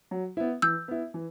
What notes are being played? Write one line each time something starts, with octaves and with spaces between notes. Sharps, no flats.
F#3
B3 E4
E3 E6 G6
B3 E4
E3